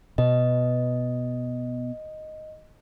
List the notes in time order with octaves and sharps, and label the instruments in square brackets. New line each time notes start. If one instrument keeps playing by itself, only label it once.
[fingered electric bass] B2 [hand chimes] D#5